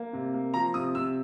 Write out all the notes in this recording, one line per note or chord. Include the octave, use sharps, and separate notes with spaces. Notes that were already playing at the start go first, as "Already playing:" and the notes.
Already playing: A#3
C3
A#3
F3 A#5
C3 D#6
C3 E6